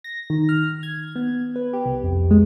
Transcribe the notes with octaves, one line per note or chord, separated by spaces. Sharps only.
A#6
D#3
F6
G#6
B3
B4
G4
C2
F2
G#3